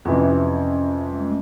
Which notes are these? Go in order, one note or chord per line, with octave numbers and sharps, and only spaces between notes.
F2 C3 E3 C#4
G3
G#3
A3